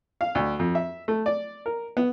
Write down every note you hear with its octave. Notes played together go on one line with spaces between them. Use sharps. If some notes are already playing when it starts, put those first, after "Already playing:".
F5
D2
F2
E5
A3
D5
A#4
B3